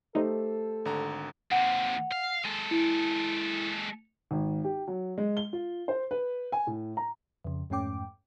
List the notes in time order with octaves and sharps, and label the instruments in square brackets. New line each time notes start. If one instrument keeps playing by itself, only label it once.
[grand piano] A3 G4 C5 [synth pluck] D#4 [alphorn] A4
[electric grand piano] G#1 D3 A#5
[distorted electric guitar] D#2 C3 [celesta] F#5
[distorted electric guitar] F5
G#3 A4
[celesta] E4
[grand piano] G#1
G4
F#3
G#3
G7
F4
C5
B4
G#5
A2
A#5
[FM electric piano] F2 C#3
F2 G#2 A3 C#4 G5 D6